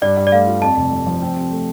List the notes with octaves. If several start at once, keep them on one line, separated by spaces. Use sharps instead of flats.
G2 D5
G2
D5
A3 F5
F4
F2 A5
F1
F3
F3
C4
C3
A3